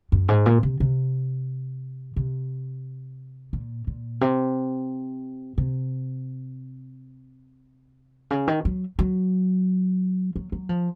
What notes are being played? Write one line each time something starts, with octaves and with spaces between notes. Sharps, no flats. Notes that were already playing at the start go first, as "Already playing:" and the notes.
F#2
G#2
A#2
C3
C3
C3
A#2
A#2
C3
C3
C#3
D#3
F#3
F#3
F#3
F#3
F3